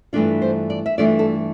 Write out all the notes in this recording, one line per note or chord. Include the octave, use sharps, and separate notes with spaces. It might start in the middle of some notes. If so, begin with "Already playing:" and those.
G2 E3 A3 D4 F4 D5
C5
D5
E5
G2 E3 A3 D4 F4 D5
A4